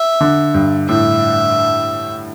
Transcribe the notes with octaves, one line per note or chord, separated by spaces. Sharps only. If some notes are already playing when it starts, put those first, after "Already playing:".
Already playing: E5
D3
G2
A2 E5